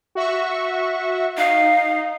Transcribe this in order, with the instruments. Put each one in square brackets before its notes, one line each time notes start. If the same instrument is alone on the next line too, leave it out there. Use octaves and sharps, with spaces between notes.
[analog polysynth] F#4 E5 C#6
[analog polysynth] D#4 [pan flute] F5